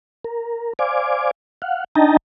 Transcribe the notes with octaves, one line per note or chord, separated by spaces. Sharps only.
A#4
C5 D5 F5 G#5 D6
F5 F#5
D4 D#4 D#5 G5 A5 A#5